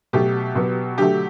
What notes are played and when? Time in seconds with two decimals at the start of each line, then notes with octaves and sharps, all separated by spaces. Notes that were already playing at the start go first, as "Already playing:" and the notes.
0.13 B2 F#3 A3 G4
0.55 B2 F#3 B3
0.97 D3 F#3 A3 G4